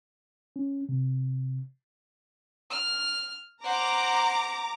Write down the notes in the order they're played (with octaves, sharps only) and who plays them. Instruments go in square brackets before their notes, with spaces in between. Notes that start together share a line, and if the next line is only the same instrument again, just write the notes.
[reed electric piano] C#4
C3
[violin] F6
[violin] C5 F#5 [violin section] A#5 D6